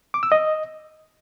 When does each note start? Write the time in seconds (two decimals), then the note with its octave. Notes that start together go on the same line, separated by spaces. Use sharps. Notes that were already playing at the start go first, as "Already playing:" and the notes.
0.14 D6
0.23 E6
0.32 D#5